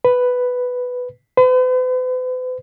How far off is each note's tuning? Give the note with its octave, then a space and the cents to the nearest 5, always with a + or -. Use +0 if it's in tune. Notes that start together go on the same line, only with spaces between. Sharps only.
B4 +5
B4 +45